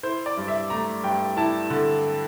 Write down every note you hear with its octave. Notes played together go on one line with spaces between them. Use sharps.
E4 C5
D5
G2
E5
A3 A#5
G2 G5
E4 A5
D3